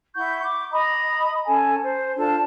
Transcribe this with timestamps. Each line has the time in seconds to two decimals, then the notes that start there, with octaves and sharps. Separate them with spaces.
0.15 E4 F#5 C#6 G6
0.44 D6
0.72 D#5 A#5 B5 D#6
1.46 C#4 A4 G#5 A5
1.84 C5
2.16 D4 F4 A4 A5